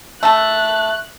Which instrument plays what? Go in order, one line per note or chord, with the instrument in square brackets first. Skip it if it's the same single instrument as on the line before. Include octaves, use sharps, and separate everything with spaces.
[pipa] A3 A4 [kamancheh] F#6